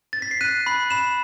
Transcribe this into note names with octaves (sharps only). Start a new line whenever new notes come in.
A6
B6
C7
F#6 D#7
B5
B5 E7